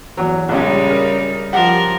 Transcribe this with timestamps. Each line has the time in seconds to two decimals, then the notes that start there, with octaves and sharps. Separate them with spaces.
0.17 E2 F#3
0.49 A#1 C#3 G3 G#3 D#4 G4
0.90 A#4
1.53 F3 G4 A#4 F#5